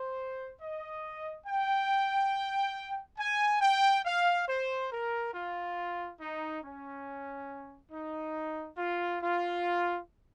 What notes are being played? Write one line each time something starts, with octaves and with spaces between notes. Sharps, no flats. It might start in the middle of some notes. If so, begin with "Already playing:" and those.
Already playing: C5
D#5
G5
G#5
G5
F5
C5
A#4
F4
D#4
C#4
D#4
F4
F4